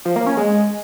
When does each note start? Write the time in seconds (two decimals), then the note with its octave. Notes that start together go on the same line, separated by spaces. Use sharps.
0.05 F3
0.16 A#3
0.26 C#4
0.37 G#3